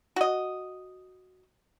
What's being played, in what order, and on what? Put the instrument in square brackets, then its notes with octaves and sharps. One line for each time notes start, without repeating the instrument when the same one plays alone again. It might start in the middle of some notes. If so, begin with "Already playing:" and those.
[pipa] F#4 D#5